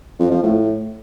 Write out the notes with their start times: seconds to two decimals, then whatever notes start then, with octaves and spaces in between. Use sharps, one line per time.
0.19 F2
0.31 F3
0.43 A2